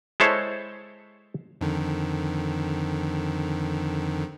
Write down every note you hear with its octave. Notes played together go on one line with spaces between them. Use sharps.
G#3 E4 A4 C5 C#5
F2 D3 D#3